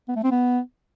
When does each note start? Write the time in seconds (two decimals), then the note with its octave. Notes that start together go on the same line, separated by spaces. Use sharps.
0.08 B3
0.16 A3
0.23 C4
0.31 B3